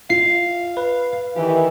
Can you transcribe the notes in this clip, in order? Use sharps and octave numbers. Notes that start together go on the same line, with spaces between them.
F4 F5 C7
B4
D#3 E3 G4